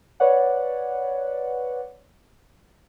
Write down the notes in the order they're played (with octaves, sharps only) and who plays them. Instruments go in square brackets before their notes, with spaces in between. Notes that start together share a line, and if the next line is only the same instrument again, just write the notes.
[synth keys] B4 C#5 D5 F#5